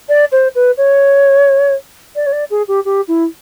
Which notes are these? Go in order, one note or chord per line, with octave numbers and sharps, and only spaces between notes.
D5
C5
B4
C#5
D5
C#5
D5
G#4
G4
G4
E4